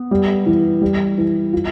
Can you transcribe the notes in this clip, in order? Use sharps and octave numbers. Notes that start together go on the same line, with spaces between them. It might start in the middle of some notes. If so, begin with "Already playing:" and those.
Already playing: B3
G3
E3
G3
E3
F4